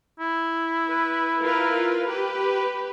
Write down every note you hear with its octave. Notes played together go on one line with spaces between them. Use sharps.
E4
B4
F4 A#4 B4
G4 B4